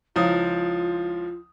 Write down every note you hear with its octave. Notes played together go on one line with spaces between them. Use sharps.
C#2 F3 E4 F4 C#5 F5 D#6